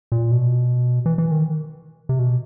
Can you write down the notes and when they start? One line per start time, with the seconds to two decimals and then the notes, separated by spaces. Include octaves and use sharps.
0.12 A#2
0.31 B2
1.06 E3
1.18 E3
1.31 D#3
2.09 C3
2.19 B2